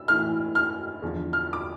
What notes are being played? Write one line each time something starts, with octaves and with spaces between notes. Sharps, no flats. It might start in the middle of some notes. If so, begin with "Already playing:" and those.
Already playing: E6
A2 E3 F6
F6
E2 D3 F3
F6
D6